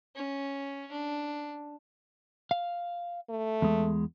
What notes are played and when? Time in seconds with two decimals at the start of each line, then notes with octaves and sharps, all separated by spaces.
0.16 C#4
0.92 D4
2.51 F5
3.30 A3
3.62 E2 G#3